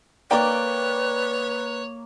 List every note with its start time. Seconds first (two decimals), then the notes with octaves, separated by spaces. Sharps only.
0.31 A#3 B4 C#5 D5 G5 D6